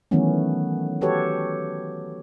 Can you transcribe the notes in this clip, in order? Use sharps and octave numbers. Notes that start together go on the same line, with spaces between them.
D#3 E3 F#3 A3 B3 C#4
F#4 G4 A4 B4 C#5